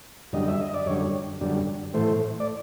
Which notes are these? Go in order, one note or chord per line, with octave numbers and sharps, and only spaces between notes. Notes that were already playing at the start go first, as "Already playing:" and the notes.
F#2 D3 G3 D#5
E5
D#5
D5
F#2 D3 G3 C#5
F#2 D3 G3
A2 E3 A3 C5
D5